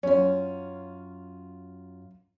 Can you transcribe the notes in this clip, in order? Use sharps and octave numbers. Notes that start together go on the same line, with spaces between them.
F#2 C#4 F4